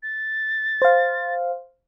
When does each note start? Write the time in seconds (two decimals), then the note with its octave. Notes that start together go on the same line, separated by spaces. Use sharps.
0.03 A6
0.82 C5 F5